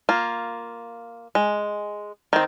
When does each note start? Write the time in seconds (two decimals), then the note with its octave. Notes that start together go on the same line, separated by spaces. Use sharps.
0.09 A#3 F4
1.35 G#3
2.33 D#3 C4